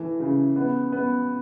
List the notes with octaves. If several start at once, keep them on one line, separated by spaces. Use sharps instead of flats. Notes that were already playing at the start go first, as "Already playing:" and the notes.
Already playing: E3 A3
C#3
B3
B3